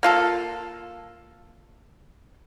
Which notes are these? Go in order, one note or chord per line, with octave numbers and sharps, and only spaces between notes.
A#3 F4 A4